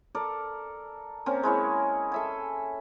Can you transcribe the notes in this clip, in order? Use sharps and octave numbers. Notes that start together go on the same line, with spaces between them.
A4 A#4 D5
A#3 C4 C#4 A#4
G#3 E4 C#5 C#6
A4 E5 G#5